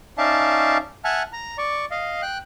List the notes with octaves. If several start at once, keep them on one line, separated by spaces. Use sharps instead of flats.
C#4 D#4 D5 E5 F5 A5
E5 F#5 G#5 A5 F6
A#5
D5 C#6
D#5 F5
G5 F#6